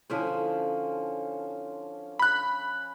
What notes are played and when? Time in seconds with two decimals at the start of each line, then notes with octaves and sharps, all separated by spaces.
0.10 D3 F3 C#4 E4 G#4 C5
2.19 B5 F#6